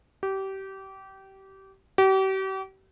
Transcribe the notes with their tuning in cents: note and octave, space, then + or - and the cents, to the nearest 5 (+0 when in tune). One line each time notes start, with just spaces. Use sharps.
G4 -25
G4 -40